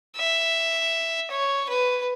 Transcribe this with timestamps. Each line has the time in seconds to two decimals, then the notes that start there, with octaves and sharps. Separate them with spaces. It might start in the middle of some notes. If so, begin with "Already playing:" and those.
0.17 E5
1.31 C#5
1.69 B4